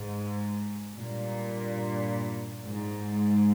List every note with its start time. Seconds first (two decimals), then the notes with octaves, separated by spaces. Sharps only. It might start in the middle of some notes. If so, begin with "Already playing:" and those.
Already playing: G#2
0.96 G2 A#2
2.64 G#2